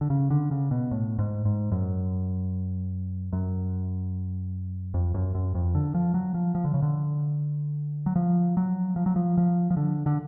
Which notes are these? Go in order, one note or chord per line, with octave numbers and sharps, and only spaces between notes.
D3
C#3
D3
C#3
B2
A2
G#2
G#2
F#2
F#2
F2
F#2
F#2
F2
D3
F3
F#3
F3
F3
D3
C#3
D3
F#3
F3
F#3
F3
F#3
F3
F3
F3
D3
D3